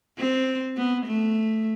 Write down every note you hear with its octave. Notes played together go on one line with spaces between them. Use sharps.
C4
B3
A3